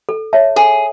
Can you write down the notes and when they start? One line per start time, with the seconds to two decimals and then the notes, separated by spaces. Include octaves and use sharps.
0.09 A4
0.33 C#5 E5 A5
0.56 G#4 A4